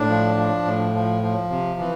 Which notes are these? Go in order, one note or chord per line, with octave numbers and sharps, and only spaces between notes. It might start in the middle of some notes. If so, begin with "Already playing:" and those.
Already playing: A2 D4
F3
F3
A2
F3
F3
C3
E3